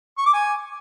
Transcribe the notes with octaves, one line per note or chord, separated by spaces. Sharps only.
C#6
D6
G#5